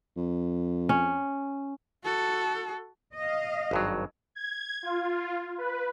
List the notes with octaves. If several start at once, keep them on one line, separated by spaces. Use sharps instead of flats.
F2
C#4
F#4 A4
D#5 F5
G#1 G2 F#3
G#6
F4
B4